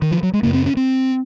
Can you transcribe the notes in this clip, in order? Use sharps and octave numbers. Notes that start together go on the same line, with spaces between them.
D#3
F3
F#3
G#3
F#2 C#3 A#3
C4
C#4
C4